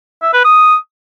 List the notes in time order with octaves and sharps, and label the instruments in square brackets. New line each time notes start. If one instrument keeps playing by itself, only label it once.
[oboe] E5
B4
D#6